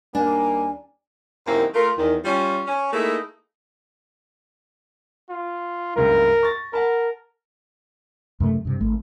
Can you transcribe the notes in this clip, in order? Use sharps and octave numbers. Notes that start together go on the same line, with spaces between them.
D#2 G3 A#3 D4 G#5
F#2 C3 D#3 A#3 C4 E4
A3 F4 A#4
E2 D#3
G3 C#4 F4
C#4
A3 A#3 D#4 E4 G#4 A4
F4
F#1 C#2 G2 A#4
C#6 A6 A#6
A#4 F#5 A5 B5
F#2 C3 A3
G2 C3
G#1 A3